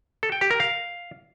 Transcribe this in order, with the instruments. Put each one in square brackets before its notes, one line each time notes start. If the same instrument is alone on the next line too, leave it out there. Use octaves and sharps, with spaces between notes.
[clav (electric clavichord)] A4
G5
G4
A#4
F5